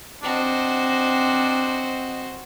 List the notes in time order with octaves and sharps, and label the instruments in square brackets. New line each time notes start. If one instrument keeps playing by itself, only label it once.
[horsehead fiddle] C4 D#5 [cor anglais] D4 [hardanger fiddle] F#4 C5